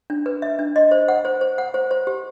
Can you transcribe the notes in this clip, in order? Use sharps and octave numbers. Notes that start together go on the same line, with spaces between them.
D4
B4
E5
D4
D#5
C5
F#5
C5
C5
F#5
C5
C5
G4